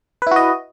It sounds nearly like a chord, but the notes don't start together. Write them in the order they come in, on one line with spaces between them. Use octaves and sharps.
B4 E4 F#4 D#5